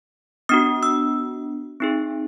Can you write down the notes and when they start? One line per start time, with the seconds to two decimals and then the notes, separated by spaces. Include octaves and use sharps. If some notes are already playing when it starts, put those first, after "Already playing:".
0.49 B3 D4 F#4 D#6
0.83 E6
1.80 C4 D#4 G#4